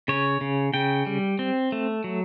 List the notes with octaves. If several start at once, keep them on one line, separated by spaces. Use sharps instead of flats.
C#3 C#5
C#3
C#3 G5
G3
C4
A3
F#3